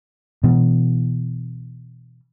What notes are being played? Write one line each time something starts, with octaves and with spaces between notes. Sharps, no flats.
B2 E3